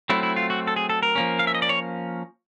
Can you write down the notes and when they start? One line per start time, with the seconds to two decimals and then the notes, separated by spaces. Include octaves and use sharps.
0.10 F#3 A3 C4 E4
0.23 E4
0.36 F4
0.50 F#4
0.67 A4
0.76 G#4
0.90 A4
1.03 A#4
1.16 F3 A#3 C#4
1.39 F5
1.47 E5
1.55 D#5
1.62 D5
1.69 C#5